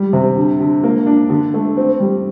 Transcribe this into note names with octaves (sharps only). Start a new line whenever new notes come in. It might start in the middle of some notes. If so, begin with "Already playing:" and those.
Already playing: G3
C3
D3
D3
A#3
D4
D3
A3
C4
G3